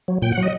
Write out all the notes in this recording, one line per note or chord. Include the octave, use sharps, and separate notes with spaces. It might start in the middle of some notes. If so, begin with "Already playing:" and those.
F#3
A#2 G5
F#5
F#3
D#5